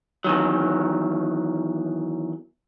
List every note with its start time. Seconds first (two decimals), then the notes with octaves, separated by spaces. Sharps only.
0.24 E2 D#3 F#3